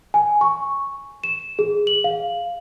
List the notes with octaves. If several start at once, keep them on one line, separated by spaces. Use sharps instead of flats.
G#5
C#6
E7
G#4
F#7
F5